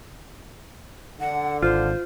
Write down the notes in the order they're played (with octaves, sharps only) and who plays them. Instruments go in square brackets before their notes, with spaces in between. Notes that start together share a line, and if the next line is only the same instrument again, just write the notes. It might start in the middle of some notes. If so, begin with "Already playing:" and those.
[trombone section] D3 [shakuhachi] F#5
[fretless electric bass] G#1 [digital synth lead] F4 [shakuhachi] C5